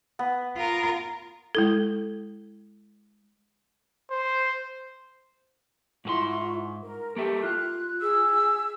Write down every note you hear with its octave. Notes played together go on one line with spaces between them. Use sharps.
B3
F4 A#4
G#3 E4 A4
C5
G#2 E4 F4 G#4 C6 C#6
A#4
A#3 G4 A4 E5
F4 F#6
G#4 E6